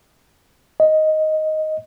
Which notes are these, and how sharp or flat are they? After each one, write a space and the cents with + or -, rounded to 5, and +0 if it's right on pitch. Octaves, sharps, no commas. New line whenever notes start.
D#5 +5